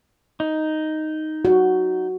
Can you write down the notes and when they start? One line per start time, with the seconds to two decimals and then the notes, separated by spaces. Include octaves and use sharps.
0.40 D#4
1.45 F#4